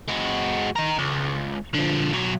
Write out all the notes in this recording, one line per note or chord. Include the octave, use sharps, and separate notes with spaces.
G#3 F#4
D#4 A#4
C#2
D3 F3
B1 F#3